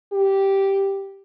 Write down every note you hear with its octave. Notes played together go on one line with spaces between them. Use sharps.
G4